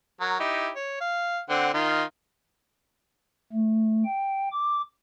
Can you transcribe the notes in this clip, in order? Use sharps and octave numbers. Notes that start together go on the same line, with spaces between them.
F#3 A#4
D#4 E4 G4
C#5
F5
D3 C4 F#5
D#3 F4 D#5
A3
G5
D6